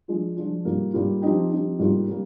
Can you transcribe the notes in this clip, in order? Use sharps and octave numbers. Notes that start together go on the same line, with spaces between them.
F3 G#3 D4 F4
F3 G#3 D4 F4
G#2 G3 A#3 F4
G#2 G3 A#3 F4
F3 C4 D#4 G4
F3 C4 D#4 G4
G#2 G3 A#3 F4
G3 A#3